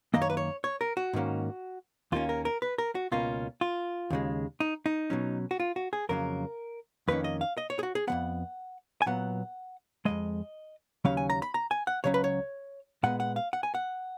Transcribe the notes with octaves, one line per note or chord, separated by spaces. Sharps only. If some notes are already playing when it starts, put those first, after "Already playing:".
F#2 D#3 A#3 D#5
C#5
B4
C#5
C#5
A#4
F#4
G#2 D#3 A#3 C#4
D#2 D#3 A#3 C#4 F4
A#4
A#4
B4
A#4
F#4
C#2 B2 A#3 C#4 F4
F4
D#2 C#3 G#3
D#4
D#4
B2 F#3 C#4
F#4
F4
F#4
G#4
F2 C#3 F#3 A#3 A#4
F2 D#3 A#3 C#4 B4
D#5
F5
D#5
C#5
G#4
F#4
G#4
F2 F3 B3 F#5
G#5
A#2 F#3 B3 F#5
F2 C#3 G#3 D#5
D#2 C#3 F#3 C#4 F5
G#5
A#5
B5
A#5
G#5
F#5
C#2 C#3 F#3 C#4 C#5
B4
C#5
A#2 G#3 B3 F#5
F#5
F5
F#5
G#5
F#5